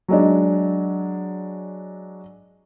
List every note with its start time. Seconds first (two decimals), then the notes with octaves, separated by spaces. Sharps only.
0.08 F#3 G#3 D4